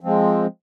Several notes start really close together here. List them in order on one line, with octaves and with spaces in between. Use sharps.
F3 C4 G#3